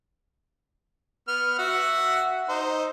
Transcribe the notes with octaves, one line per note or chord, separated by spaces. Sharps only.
B3 F6
F#4 E5 F#5
D#4 C5